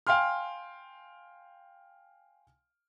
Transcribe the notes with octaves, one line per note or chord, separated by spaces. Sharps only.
F5 G5 G#5 C6 F6